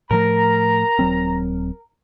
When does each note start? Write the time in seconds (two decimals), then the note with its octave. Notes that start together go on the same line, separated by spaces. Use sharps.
0.11 A2 F3 A3 A#4 A#5
0.99 D#1 F#3 C4